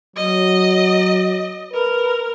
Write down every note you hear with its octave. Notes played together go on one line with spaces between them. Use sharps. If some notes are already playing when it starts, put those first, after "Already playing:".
F#3 D#5
A#4 B4